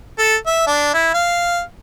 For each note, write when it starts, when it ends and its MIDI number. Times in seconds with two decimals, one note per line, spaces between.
0.19 0.36 69
0.46 0.63 76
0.67 0.94 62
0.94 1.10 64
1.14 1.61 77